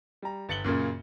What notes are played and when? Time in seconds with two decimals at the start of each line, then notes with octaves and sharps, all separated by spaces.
0.22 G3 A#5
0.49 G1 A6 C#7 F#7 G7
0.64 F#2 A#2 C#3 A#3